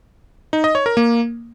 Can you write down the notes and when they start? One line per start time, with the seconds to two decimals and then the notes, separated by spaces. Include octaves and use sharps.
0.53 D#4
0.64 D#5
0.75 C#5
0.86 A#4
0.97 A#3